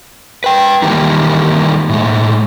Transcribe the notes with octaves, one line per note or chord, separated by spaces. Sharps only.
B4 G5
D#3 E3 G3 A#3 D#4
A2 G#3